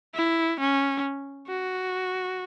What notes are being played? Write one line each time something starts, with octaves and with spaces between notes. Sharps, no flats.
E4
C#4
F#4